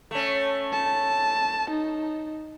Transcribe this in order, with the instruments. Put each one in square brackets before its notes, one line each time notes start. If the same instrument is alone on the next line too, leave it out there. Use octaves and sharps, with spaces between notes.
[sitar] A3 C#4
[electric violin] A5
D#4